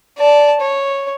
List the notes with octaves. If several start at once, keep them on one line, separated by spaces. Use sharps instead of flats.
D5 A5
C#5